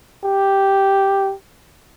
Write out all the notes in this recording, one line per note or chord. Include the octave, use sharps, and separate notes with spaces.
G4